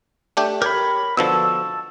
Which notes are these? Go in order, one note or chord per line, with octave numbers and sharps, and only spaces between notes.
A3 D4 G4
G4 A#4 C#5 B5
B2 D3 F3 A5 C#6 E6